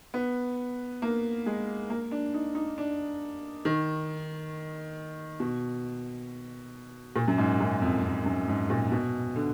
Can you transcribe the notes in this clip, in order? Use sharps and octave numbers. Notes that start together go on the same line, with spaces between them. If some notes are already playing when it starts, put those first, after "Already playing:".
B3
A#3
G#3
A#3
D4
D#4
D#4
D4
D#3
B2
A#2
F#2
G#2
F#2
F2
F2
F#2
G#2
A#2
B2
D3